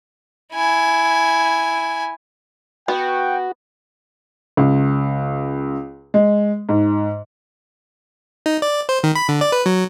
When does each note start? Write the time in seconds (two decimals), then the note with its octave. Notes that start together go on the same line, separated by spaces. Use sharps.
0.53 E4 G#5
2.88 B3 F#4 G5
4.57 C#2
6.14 G#3
6.69 G#2
8.46 D#4
8.62 D5
8.89 C5
9.04 D#3
9.15 B5
9.29 D3
9.41 D5
9.52 B4
9.66 F#3